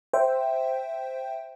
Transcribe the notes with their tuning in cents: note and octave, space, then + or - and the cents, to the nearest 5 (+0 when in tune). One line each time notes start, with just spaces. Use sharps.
C5 +0 E5 +0 G5 +0